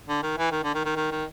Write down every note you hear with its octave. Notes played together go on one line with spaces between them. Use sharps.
D3
D#3
E3
D#3
D3
D#3
D#3
D#3
D#3